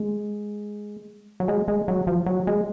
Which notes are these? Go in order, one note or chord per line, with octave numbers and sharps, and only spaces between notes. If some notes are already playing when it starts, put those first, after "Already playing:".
Already playing: G#3
F#3
G#3
G#3
F#3
F3
F#3
G#3